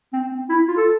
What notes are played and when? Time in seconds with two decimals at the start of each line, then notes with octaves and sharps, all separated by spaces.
0.13 C4
0.32 C4
0.49 E4
0.68 F4
0.77 A4